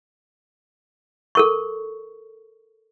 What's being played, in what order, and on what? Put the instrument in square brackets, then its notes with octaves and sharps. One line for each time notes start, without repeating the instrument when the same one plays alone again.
[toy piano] A4 A#4 C#6